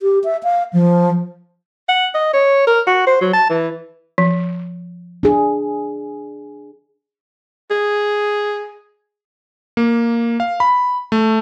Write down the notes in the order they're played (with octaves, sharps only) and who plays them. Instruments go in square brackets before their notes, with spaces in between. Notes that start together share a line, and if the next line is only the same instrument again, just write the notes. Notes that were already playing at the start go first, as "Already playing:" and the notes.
[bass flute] G4
E5
F5
F3
[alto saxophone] F#5
D#5
C#5
A#4
F#4
C5
F#3
A5
E3
[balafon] F3
[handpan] D4 G#4
[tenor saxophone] G#4
[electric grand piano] A#3
F5
B5
A3